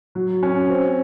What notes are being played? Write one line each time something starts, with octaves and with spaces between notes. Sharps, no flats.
F#3
C#4
C4